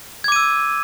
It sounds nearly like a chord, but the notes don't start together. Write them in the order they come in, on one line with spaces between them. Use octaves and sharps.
G#6 D6 D#7 E6